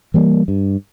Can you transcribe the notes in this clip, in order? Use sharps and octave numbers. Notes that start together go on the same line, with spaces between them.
E3 G3 A#3
G2